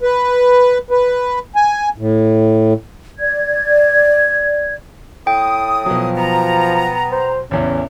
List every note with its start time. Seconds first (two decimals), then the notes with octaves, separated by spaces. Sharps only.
0.01 B4
0.91 B4
1.56 G#5
1.98 A2
3.18 D5 G#6
5.27 A2 G5 D#6
5.86 B2 F3 F#3
6.17 B3 A#5
7.11 C5
7.51 A1 E2 C#3 C#4